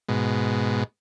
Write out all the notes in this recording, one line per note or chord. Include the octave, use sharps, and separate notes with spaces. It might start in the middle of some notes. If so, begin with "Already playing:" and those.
G#2 B2